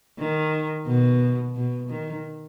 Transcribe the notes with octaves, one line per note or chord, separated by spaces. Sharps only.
D#3
B2
B2
D#3